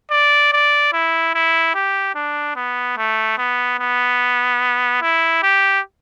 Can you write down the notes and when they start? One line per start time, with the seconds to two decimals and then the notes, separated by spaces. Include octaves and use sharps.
0.11 D5
0.53 D5
0.93 E4
1.35 E4
1.75 G4
2.15 D4
2.56 B3
2.97 A3
3.38 B3
3.80 B3
5.02 E4
5.43 G4